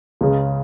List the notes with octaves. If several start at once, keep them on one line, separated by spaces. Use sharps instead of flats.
C#2 C#3 G#3